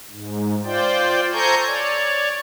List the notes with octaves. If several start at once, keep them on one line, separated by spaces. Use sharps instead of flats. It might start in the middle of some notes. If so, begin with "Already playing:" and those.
G#2
F4 C5 D5 G5
A4 C5 G#5 A#5 C#6 G6
C#5 D5